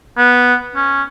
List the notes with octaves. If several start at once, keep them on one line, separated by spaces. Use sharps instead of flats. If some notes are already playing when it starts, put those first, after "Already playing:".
B3
C#4